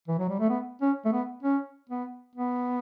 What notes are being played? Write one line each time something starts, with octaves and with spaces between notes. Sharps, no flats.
E3
F#3
G3
A3
B3
C#4
A3
B3
C#4
B3
B3